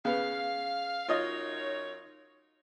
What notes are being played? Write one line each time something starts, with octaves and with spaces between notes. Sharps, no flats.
C#3 B3 F5
F#2 D#4 F4 C#5 D#5